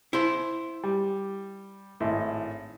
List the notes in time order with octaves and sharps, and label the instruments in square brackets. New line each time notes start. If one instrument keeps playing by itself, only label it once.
[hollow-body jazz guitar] E4 C5
[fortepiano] G3
G#1 A2